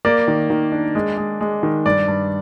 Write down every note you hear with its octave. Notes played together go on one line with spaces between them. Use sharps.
A#3 D5
D#3
D#3
D4
G#3
G#3
G#3
D#3
G2 D5
G2